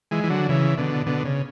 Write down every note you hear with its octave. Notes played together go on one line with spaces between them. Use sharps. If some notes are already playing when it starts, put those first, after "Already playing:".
E3 G#3
E3
D3 F#3
C#3 E3
B2 D3
B2 D3
C#3